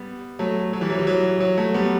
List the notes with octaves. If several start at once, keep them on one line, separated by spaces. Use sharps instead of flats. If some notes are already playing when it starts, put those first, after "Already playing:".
Already playing: G3 B3
F#3 A3
F#3
E3 G3
F#3
E3
F#3
F#3
F#3 A3
G3 B3